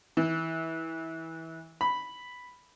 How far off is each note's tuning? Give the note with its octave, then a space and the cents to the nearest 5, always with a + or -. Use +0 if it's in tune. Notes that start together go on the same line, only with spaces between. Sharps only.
E3 -20
B5 +0